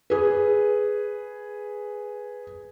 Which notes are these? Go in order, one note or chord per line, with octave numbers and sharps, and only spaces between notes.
G#4 B4